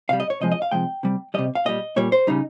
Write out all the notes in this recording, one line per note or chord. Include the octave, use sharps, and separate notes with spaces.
C3 G3 F5
D#5
C#5
C3 F3 G#3 D#5
D#5
F5
C3 F3 G#3 G5
C3 G3
C3 G3 D#5
F5
A#2 G3 D#5
A#2 G3 C#5
C5
C#3 G3 D#4